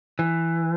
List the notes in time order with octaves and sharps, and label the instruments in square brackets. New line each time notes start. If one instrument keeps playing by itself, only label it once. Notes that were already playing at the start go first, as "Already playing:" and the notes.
[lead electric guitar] E3